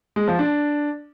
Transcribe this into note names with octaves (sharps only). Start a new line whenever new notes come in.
G#3
F3
D4